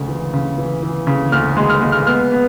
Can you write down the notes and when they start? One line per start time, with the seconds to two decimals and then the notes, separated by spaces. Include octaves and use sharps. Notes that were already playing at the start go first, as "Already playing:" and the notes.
Already playing: D2 C#3 G#3
0.08 E3
0.34 C#3
0.58 E3
0.83 E3
1.07 C#3
1.32 D2 F6
1.57 G#3
1.70 F6
1.82 G#3
1.92 F6
2.07 B3 F6
2.32 B3